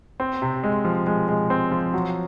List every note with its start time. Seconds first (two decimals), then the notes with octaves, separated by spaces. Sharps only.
0.20 C4
0.42 C3
0.64 G#3
0.85 F3
1.07 G#3
1.29 G#3
1.50 C4
1.72 F3
1.94 F#3